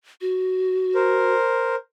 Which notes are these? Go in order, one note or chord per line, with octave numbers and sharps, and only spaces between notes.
F#4
A#4 C5